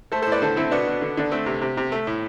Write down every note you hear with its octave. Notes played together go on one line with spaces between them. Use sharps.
A3 A4 C5
A4 C5
A2
B4 D5
D3 A4 C5
D3 C4 E4
B2 B3 D4
B2
D3
D3 D4
A3 C4
C3
C3
C3
A3
A2